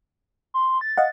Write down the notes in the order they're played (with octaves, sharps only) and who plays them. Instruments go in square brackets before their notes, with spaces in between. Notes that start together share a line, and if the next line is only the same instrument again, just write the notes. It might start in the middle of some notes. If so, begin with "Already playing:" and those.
[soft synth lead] C6
A6
[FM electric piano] D#5 F5 F#5